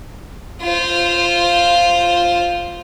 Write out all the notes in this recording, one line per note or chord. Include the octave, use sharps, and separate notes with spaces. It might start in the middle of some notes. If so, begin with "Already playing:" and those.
F4 C5